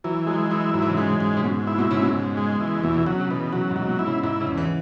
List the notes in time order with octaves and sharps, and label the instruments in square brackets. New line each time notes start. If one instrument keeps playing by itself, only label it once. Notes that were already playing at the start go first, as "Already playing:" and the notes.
[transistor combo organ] E3 [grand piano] F#3
[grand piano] F#3 [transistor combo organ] G#3
[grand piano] E3 [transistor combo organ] E4
[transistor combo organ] G#2 [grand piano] F#3
[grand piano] E3
C#3
[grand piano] E3 [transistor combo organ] G#3
[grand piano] C#3
[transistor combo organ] G#2
[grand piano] C#3
[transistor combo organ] G#2 [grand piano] B2
[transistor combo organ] E4
[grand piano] B2
[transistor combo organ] G#2 [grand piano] C#3
[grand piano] B2
[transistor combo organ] G#2
G#3
E3
[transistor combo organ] E2 [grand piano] B2
[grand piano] B2
[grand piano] C#3 [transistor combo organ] F#3
[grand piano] C#3
[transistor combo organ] B2 [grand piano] E3
[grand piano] C#3 [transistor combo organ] F#3
[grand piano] G#2
[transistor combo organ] F#3
[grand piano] G#2
B2
[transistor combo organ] E4
[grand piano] C#3
[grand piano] G#2 [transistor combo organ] E4
[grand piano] C#3
[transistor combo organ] E2
[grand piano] E3